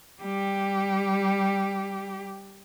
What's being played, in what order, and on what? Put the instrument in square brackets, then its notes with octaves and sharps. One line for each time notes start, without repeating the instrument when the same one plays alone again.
[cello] G3 G4